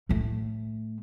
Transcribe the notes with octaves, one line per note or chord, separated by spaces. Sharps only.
A2 A3